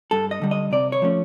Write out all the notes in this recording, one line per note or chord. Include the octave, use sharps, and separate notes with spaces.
G2 A4
D#5
D3 G3
D#5
C3 D5
C#5
F3 A3 C#4